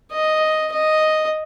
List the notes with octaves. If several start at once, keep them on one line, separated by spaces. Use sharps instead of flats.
D#5
D#5